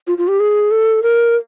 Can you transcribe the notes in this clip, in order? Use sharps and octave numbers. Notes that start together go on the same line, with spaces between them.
F4
F4
G4
G#4
A4
A#4